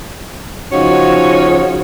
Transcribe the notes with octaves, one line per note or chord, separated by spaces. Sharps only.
C#3 F3 C#4 D#4 F#4